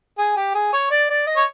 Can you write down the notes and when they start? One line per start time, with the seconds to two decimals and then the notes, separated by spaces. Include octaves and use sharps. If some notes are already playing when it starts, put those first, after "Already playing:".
0.18 G#4
0.37 G4
0.55 G#4
0.73 C#5
0.91 D5
1.09 D5
1.27 D#5
1.36 C#5